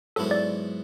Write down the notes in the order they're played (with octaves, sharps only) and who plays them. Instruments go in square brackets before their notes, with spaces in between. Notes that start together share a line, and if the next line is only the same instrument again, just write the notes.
[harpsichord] G#2 F#3 B3 E4 [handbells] A4
[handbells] D5